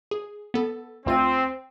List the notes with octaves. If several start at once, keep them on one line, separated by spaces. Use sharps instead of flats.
G#4
B3 A4
D2 C4 F4 D#7